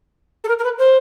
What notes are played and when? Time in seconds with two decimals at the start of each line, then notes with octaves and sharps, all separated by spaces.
0.44 A4
0.48 A#4
0.59 A#4
0.64 B4
0.79 C5